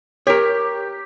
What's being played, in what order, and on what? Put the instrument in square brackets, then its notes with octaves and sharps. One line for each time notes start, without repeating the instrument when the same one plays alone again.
[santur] G4 [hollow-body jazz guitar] A#4 C#5